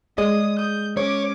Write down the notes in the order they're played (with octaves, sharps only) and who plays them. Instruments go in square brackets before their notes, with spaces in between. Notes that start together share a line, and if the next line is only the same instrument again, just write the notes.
[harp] G#3 [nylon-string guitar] G#4 D5 D#5 [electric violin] D#6
[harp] D#6 [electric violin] G6
[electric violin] C#4 D6 [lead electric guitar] C#5